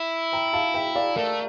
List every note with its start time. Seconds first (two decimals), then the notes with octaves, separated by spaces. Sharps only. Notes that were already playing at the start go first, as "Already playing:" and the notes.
Already playing: E4
0.32 G5 A#5
0.53 F5 A5
0.74 E5 G5
0.95 D5 F5
1.16 A3 A#4 D5